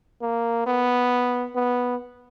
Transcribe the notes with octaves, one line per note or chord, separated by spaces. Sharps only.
A#3
B3
B3